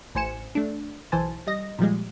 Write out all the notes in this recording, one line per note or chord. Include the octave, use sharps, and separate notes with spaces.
A1 A2 C5 G#5 C#7 E7
A3 D4
B1 E3 C5 G#5 A5
G3 D#5 A#6
A#2 F3 G3 G#3